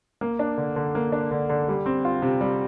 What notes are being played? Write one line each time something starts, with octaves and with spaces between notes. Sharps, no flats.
A#3
D4
D3
D3
A#3
D4
D3
D3
G3
C4
F4
C3
G3